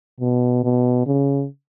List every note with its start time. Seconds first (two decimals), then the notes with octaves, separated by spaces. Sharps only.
0.21 B2
0.64 B2
1.07 C#3